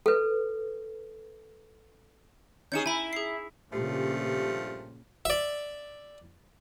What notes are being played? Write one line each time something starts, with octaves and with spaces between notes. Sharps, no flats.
A4 B4
C#4 D#4 G#4 G6 C#7 E7
E4 G#5 B5
G#4 C7
G2 A#2 C#3 F3 A3 G4
D5 E5